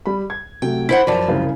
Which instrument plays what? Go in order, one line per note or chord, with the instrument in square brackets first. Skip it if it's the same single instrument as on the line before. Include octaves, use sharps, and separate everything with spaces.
[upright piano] G3 B5
G#6
[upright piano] C3 F#3 A3 [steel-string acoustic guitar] G5
[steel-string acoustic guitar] E4 C5 F#5 [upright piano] B6
[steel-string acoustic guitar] F#2 F3 [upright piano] D5 A5
[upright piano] C2 C#3 A#4